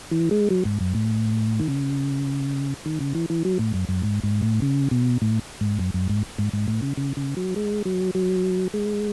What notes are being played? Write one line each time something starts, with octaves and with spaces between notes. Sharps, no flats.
E3
G#3
F#3
G#2
F#2
A2
D#3
C#3
D#3
C#3
E3
E3
F#3
A2
F#2
F#2
G#2
G#2
A2
C#3
B2
A2
G#2
F#2
F#2
G#2
G#2
G#2
A2
C#3
C#3
C#3
F#3
G#3
F#3
F#3
G#3